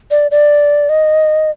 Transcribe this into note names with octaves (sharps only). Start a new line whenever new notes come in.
D5
D5
D#5